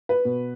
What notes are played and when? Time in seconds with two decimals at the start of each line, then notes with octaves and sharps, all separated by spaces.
0.09 B4
0.25 B2